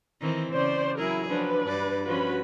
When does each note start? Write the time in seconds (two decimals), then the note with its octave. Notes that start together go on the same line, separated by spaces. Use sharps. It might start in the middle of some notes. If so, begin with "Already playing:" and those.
0.21 D#3 E3 C4
0.53 C#3 C5 D5
0.98 F#3 E4 G#4 A#4
1.29 F3 F#3 D4 B4
1.66 G2 D5
2.06 F3 C#4 F#4 B4 B5